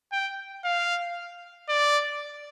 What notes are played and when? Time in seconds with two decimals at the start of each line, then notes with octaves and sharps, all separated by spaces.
0.12 G5
0.64 F5
1.69 D5